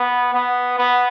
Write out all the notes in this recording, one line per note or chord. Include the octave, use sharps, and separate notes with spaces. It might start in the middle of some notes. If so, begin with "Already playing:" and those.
Already playing: B3
B3
B3